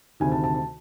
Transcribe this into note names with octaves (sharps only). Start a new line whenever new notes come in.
D2 C3 D#3 G#5
A5
A5
A5